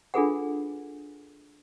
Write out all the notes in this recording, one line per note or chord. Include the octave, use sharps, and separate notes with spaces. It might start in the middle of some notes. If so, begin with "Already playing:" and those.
D4 F4 G#4 A4 B4 F#5